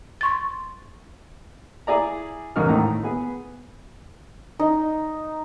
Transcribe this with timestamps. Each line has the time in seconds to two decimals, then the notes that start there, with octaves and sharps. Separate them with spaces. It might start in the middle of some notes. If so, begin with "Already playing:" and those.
0.21 C6 C#6 A6
1.87 E4 G#4 D5 A#5
2.56 E2 G#2 C#3 A#4 F6
2.69 A2 D#3 A#5
3.03 B3 G#4
4.59 D#4